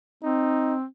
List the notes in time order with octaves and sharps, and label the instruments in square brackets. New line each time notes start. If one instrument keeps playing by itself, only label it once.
[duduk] C4 [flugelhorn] D#4